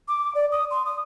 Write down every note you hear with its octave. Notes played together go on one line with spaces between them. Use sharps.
D6
D5
D#6
C6
D#6